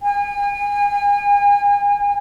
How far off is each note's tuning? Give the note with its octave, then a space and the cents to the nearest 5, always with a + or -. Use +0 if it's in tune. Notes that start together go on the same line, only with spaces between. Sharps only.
G#5 -40